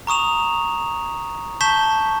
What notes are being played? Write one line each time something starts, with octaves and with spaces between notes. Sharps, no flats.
A#5 C#6 D#6 E7 F7
A5 C#6 G6 B6 E7 G7